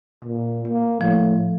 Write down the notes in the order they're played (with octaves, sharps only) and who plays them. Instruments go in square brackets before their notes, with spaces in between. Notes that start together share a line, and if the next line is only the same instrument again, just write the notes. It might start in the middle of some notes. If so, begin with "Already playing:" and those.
[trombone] A#2
A#3
[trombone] A2 [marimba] F3